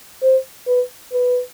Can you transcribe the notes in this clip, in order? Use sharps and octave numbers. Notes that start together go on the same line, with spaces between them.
C5
B4
B4